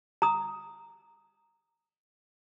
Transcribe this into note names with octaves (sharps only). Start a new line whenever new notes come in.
A#5 D#6